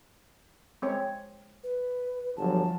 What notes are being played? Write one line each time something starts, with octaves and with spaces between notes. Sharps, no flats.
G#3 C4 C#5
B4
G1 F3 F#3 A5